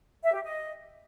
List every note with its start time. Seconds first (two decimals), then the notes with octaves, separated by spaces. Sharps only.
0.24 E5
0.34 G4
0.43 D#5